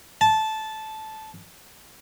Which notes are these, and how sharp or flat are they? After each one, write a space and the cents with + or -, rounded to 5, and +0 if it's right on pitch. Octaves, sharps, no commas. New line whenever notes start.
A5 -10